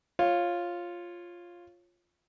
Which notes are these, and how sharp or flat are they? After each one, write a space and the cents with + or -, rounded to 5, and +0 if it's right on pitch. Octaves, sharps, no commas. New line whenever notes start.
F4 +0 C#5 -15